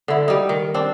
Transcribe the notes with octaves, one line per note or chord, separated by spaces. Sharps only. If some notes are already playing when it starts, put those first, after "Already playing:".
D3 E4
G3 D#4
D#3
C4 D4